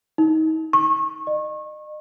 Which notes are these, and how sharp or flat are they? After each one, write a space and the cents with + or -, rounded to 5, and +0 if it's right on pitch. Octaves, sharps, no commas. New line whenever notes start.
D#4 +25
C#6 -30
D#5 -35